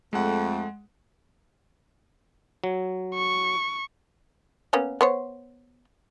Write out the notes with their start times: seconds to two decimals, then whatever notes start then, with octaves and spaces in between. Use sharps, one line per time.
0.13 F2 G#3 A3 F#5
2.64 F#3
3.15 C#6
4.73 A#3 B3 C#4
5.01 B3 C5 C#5